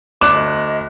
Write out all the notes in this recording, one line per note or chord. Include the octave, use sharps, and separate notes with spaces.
D2 D5 D6 F#6 E7
D#5